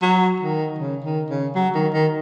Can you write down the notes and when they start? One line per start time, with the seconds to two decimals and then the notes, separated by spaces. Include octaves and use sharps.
0.02 F#3
0.40 D#3
0.78 C#3
1.04 D#3
1.30 C#3
1.55 F#3
1.75 D#3
1.94 D#3